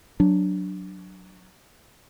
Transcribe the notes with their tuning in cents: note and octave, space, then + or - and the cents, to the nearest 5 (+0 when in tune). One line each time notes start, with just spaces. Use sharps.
F#3 +0 D4 +0